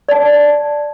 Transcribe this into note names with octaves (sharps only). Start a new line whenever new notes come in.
D5 A5